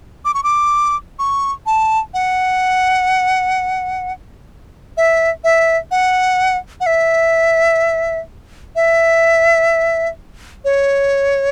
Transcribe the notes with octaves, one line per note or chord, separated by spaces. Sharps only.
D6
C#6
D6
C#6
A5
F#5
E5
E5
F#5
F#5
E5
E5
C#5